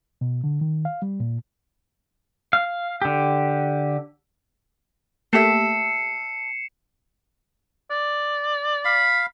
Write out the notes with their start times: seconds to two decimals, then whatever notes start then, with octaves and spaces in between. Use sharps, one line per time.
0.21 B2
0.44 D3
0.61 D#3
0.85 F5
1.02 G3
1.20 A#2
2.53 F5
3.02 D3 G4
5.33 A3 A#3 G4 A4 E5 C7 C#7 E7
7.91 D5
8.85 F5 B5